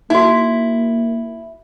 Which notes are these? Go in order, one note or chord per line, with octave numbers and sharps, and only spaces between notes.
A#3 D#4 E4 F#4